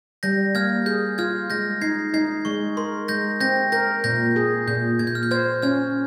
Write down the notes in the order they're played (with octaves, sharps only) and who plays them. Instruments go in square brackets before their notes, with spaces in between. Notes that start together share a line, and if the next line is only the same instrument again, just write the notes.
[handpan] G3 [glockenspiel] G6 A#6
[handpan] A#3 [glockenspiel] F6 G#6
[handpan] G#4 [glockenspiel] G6
[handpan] F4 [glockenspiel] F6 G#6
[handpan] G#3 [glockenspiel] G6 A#6
[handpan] D#4 [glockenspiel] G#6 C7
[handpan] D#4 [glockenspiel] G#6 C7
[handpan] G#3 [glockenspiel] C#6
[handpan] A#4 [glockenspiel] C6
[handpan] G#3 [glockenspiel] G6 A#6
[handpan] C4 [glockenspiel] G6 A#6
[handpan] A#4 [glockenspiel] G6 A#6
[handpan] A#2 [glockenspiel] G6 A#6
[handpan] G#4
[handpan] A#2 [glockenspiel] G6
[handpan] A#2 [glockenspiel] G#6
[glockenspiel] G6
F6
G6
[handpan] C5 [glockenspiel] F6 G#6
[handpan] C#4 [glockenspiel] F6 G#6